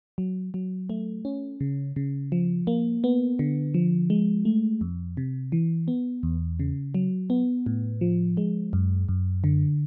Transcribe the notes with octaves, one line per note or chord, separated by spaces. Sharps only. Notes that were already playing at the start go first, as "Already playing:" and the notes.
F#3
F#3
A3
C#4
C#3
C#3
F3
A#3
B3
D3
F3
G#3
A3
F2
C3
E3
B3
E2
C#3
F#3
B3
A2
F3
G#3
F#2
F#2
D3